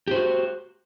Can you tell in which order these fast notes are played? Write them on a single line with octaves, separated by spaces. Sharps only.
G4 C5 F#4